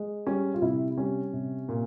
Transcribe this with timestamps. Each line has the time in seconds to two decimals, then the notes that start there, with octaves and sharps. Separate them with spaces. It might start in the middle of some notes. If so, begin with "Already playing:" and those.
Already playing: G#3
0.27 G3 C#4
0.54 F4
0.62 C3 E4
0.97 G3 C#4
1.33 C3
1.69 A#2